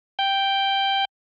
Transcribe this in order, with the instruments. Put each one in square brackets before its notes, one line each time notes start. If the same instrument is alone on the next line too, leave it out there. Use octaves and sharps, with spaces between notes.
[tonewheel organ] G5